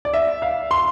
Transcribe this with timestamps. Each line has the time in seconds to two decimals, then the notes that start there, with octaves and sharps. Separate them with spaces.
0.05 D5
0.14 E5
0.42 F5
0.71 C6